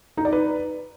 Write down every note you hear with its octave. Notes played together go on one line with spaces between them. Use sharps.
D#4
D5
B4